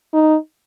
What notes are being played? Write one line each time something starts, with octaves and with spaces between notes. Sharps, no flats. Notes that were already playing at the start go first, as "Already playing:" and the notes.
D#4